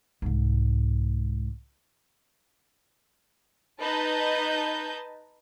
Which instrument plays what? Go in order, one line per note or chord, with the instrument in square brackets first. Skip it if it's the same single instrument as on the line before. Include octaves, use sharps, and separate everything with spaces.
[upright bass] C2 G#2
[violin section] D#4 B4 D#5 A5 G6